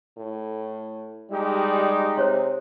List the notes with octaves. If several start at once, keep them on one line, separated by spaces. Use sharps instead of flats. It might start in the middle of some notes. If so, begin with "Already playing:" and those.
A2
G3 G#3 D#4 G4
C3 C5 C#5 C6